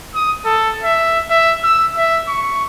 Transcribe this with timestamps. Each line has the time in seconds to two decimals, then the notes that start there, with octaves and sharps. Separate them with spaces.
0.15 D#6
0.45 A4
0.84 E5
1.30 E5
1.64 E6
1.97 E5
2.28 C#6